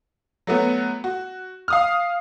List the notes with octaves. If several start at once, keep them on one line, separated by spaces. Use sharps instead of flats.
F#3 A3 B3
F#4
F5 D#6 F6